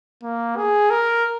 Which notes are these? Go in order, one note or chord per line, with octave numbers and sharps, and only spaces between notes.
A#3
G#4
A#4